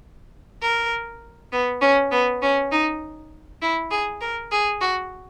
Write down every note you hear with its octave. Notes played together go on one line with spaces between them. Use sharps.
A#4
B3
C#4
B3
C#4
D#4
E4
G#4
A#4
G#4
F#4